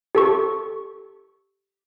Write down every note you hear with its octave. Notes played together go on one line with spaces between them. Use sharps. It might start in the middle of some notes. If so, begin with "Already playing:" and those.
G4 A4 C#6